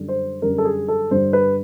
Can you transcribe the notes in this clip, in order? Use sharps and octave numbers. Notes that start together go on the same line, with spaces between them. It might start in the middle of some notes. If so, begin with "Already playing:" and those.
Already playing: F#2 D3 G3
C5
F#2 D3 G3 A#4
A4
G#4
A4
G2 D3 G3 C5
B4